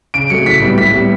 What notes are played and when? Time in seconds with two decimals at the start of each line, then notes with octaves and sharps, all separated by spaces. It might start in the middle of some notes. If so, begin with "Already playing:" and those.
0.14 C#3 D7
0.30 F#3 A3 C#7
0.46 A2 B6
0.62 G3 B3
0.78 A2 B6
0.94 G3 B3